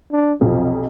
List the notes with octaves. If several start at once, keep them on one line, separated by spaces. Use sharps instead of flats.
D4
B1 F2 C3 F3